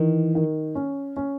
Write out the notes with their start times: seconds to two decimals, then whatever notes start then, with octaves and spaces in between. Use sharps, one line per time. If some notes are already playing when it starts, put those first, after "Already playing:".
Already playing: D#3 E3
0.35 D#3
0.75 C#4
1.17 C#4